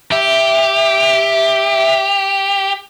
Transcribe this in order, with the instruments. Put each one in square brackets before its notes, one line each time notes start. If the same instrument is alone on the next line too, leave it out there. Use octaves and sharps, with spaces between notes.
[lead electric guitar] G4 [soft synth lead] E5